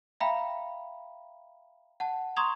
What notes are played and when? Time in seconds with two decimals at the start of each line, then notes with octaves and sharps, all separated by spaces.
0.20 E5 F5 G5 A#5 B5
2.00 F#5 A5
2.36 A#5 C6 C#6 D#6 G#6 F7